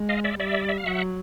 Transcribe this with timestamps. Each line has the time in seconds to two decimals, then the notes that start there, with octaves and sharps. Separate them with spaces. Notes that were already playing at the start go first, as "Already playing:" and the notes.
Already playing: G#3
0.09 D#5 F5
0.24 D5 E5
0.40 G3 D5 E5
0.69 E5
0.77 F5
0.86 F#3 E5 F#5